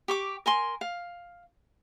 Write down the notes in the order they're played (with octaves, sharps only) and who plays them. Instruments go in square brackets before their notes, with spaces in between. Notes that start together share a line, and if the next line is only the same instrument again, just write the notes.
[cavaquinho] G4 C#6 D6
A#4 G#5 C6
F5